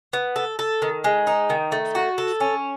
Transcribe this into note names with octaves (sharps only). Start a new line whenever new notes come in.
B3
A4
A4
D#3
G#3
D#4
D#3
A3
F#4
A4
C#4